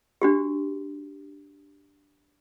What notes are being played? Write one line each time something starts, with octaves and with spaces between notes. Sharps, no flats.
D4 F#4 G4